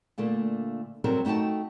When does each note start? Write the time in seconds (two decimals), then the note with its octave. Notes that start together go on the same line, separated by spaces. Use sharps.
0.18 A#2 D3 A3 A#3
1.04 C3 F#3 G3 C4 A4 A#4
1.25 A3 D#4 F#4 G5 A5